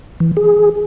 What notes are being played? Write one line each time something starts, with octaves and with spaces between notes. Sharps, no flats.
E3
G#4